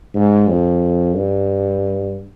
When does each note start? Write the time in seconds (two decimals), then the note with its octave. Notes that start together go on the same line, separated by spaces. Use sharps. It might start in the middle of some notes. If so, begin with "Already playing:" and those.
0.15 G#2
0.49 F2
1.16 G2